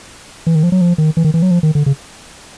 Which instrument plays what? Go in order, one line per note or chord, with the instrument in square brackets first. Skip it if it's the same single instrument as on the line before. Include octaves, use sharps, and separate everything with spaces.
[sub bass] E3
D#3
F3
F#3
F3
D#3
E3
D#3
E3
F#3
F3
D#3
D3
C#3